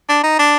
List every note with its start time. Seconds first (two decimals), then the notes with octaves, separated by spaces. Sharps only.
0.09 D4
0.24 D#4
0.39 D4